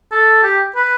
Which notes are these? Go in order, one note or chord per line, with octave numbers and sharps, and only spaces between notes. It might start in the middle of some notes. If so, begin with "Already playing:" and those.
A4
G4
B4